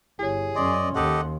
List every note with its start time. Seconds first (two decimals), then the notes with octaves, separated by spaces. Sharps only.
0.19 G1 E4 G4 G#4 C#5
0.55 F#2 C#4 D5 D#5 C6 D#6
0.95 D#2 G4 A4 D#5 F#5